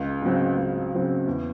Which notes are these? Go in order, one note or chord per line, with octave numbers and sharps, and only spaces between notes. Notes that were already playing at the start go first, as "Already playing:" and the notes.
Already playing: C#2
C#3 F#3 C4
C#2
C#3 F#3 C4
E2